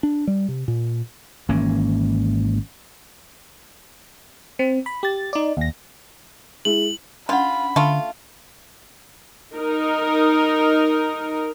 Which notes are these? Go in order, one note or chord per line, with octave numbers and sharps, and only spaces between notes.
D4
G3
C3
A#2
G#1 E3 A#3 C#4
C4
B5
G4 A6
D#4 D5
D#2 A#6
G#3 E4 F#7
C#4 D4 F4 F#5 B5
D3 A3 F4
D#4 A#4